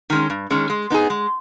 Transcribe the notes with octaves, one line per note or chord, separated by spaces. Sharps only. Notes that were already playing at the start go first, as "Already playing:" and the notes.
D#3 G#3 C#4
G2
D#3 G#3 C#4
G#3
B3 D#4 G#4
G#3